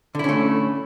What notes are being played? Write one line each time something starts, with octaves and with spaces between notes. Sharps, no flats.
D3 A3 C#4 E4